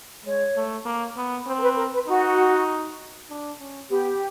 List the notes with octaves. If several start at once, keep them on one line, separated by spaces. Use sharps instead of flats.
G#3 C#5
A3
A#3
B3
C4 C5
A#4
B4
A#4
B4
D#4 F#4
D4
C#4
B3 G4